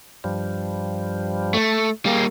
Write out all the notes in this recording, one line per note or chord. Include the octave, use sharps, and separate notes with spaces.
G2 F3 G3
A3
G3 A#3 G#4 F5 G5